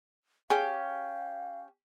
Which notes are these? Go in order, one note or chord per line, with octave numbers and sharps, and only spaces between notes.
C#4 G4 G#4 F5